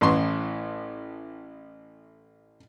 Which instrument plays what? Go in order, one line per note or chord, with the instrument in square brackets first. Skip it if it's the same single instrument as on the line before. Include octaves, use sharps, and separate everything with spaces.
[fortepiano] A1 A2 E3 C6 C#6